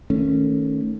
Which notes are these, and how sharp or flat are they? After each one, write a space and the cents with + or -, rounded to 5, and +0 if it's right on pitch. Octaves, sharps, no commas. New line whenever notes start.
D#3 +5 A3 -5 C#4 -10